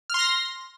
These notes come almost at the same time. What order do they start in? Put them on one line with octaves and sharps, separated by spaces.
F6 C6 A#6